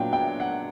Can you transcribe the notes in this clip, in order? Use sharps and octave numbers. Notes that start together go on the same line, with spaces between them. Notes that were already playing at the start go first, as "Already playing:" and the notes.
Already playing: A#2 F#3 B3 D4 F4 G5
G5
F#5